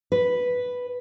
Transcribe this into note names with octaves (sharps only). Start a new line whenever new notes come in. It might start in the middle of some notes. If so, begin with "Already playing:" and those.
B4